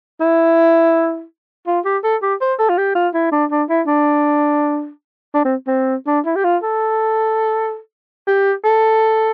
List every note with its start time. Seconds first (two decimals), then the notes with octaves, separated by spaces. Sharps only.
0.21 E4
1.67 F4
1.85 G4
2.04 A4
2.22 G4
2.41 C5
2.59 A4
2.69 F4
2.78 G4
2.95 F4
3.14 E4
3.32 D4
3.51 D4
3.69 E4
3.87 D4
5.34 D4
5.44 C4
5.67 C4
6.07 D4
6.25 E4
6.36 G4
6.44 F4
6.63 A4
8.27 G4
8.64 A4